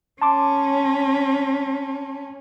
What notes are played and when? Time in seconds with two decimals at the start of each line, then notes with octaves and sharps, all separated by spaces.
0.22 C#4 A5 C6 D6